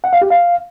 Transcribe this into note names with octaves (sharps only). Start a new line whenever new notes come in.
F#5
F5
G4
F5